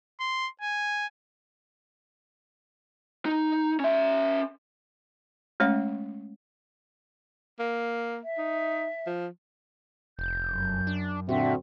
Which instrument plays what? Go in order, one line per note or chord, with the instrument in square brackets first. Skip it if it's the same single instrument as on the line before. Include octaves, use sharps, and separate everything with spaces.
[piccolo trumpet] C6
G#5
[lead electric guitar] D#4
C#4 E5
[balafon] G#3 A3 C#4 C#5 E5
[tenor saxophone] A#3
[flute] E5
[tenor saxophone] D#4
F3
[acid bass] F1 [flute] G6
[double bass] F#2
[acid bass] D4
[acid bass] A#2 [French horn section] D3 C4 F#4 [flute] E5